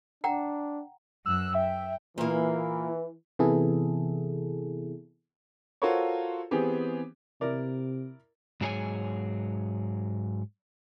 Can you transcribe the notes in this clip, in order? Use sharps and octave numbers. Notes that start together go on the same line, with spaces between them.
D4 F#5 G5 A#5
F#2 E6 F#6
E5 G5
A#2 E3 A#3
C3 E3 B3 E4 G#4 A4
F4 F#4 A4 A#4 C5 C#5
E3 B3 C4 G4 G#4
C3 E4 A#4 D5
G#2 F#3 G#4 A4 C#5 G#5